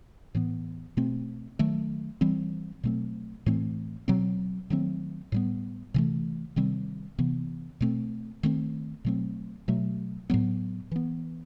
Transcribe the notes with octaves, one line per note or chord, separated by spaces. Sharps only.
A2 E3 B3
B2 A3 C4
D#3 F#3 A3
E3 G3 C4
B2 F#3 A3 C4
A2 E3 A3 C4
B2 F#3 C4
D#3 F#3 A3 C4
A2 G3 B3
C3 E3 A3
C3 D#3 G3 C4
C3 E3 B3
B2 A3 C4
D#3 A3 C4
B2 F#3 A3 C4
B2 F#3 A3
A2 F#3 B3
E3 B3